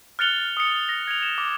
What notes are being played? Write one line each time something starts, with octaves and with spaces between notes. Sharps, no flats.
F6 F#6 A6 C#7 F7 G7
D#6 C#7
A#6
G#6 D7 F7
E7
D6